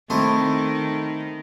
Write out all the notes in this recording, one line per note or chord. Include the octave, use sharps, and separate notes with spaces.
D#3 A3 C4 D#4 E4